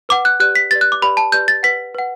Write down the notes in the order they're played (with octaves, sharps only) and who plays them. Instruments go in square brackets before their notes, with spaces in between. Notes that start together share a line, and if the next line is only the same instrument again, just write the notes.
[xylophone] B4 F#5 D6
F#6
G4 B4 D5 F#6
B6
G4 B4 D5 A6
F#6
D6
G4 B4 D5 B5
A5
G4 B4 D5 G6
A6
B4 F#5 B6
B4 F#5